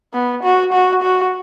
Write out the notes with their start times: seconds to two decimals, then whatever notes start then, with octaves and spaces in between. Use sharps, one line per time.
0.14 B3
0.43 F#4
0.72 F#4
1.03 F#4